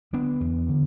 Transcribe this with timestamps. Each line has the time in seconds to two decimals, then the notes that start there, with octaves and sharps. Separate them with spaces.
0.13 D3 B3 D4
0.40 E2
0.68 D3